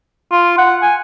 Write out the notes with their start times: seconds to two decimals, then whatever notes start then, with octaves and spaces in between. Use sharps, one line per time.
0.31 F4
0.58 F#5
0.82 G#5